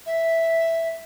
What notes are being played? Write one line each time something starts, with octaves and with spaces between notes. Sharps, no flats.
E5